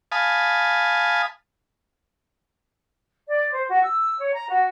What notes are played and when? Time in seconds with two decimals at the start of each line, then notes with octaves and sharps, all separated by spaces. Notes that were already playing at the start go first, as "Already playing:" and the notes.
0.12 F5 G#5 A5 B5 D#6
3.27 D5
3.52 C5
3.68 F#4
3.83 E6
4.19 C#5
4.34 A#5
4.49 F#4